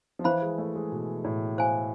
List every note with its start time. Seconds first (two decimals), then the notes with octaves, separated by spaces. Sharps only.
0.19 F3
0.24 E3 C5 F5 B5
0.42 G#3
0.58 A3
0.75 G#3
0.92 B2
1.24 A2
1.58 C5 F5 G#5